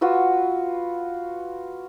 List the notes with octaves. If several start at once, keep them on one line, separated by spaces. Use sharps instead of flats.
F4 F#4 B4 E6